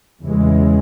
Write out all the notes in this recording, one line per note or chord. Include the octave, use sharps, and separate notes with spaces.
E2 C#3 E3 G#3